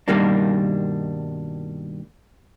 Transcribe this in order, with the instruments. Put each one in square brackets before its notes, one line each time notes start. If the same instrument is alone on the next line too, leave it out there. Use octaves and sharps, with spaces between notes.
[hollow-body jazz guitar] G2 B2 D#3 G3 A#3 D4